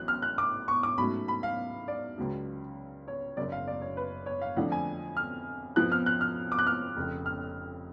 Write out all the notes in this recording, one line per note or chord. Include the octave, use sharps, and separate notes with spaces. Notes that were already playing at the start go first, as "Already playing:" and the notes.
Already playing: A1 A2 F#3 F#6
F6
F#6
D6
C#6
D6
G#2 F#3 A3 C#4 B5
B5
F5
D5
C#2 C#3 F#3
C#5
F#1 F#2 C#3 D5
F5
D5
C#5
B4
C#5
F5
F2 D3 F3 A3 D4 F#5
G#5
F6
F2 F3 B3 F#6
F6
F#6
F6
D6
F#6
F6
F1 F2 C#3
F6